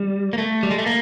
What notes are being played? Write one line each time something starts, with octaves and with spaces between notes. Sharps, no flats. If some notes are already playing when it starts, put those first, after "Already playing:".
Already playing: G3
A#3
A3
G3
G#3
A3
A#3